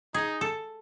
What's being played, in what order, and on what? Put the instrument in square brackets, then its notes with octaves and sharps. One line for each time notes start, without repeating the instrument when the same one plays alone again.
[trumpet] D#4 [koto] G#4
[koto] A4